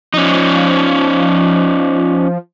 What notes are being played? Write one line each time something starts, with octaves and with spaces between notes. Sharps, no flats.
F3 C#4 D#4